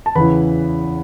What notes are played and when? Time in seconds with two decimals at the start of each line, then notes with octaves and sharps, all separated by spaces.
0.06 A5
0.15 E2 C#3 E3 B4 B5